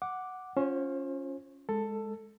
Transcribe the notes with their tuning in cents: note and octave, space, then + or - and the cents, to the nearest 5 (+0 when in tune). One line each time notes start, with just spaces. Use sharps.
F#5 +0 D6 +0
C#4 +0 F4 +0 C5 +35
G#3 +0 A4 +10